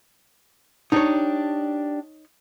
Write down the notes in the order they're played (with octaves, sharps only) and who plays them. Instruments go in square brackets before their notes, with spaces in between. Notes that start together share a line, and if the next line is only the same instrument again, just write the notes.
[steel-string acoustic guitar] D4 G4 [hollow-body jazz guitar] D#4 C#5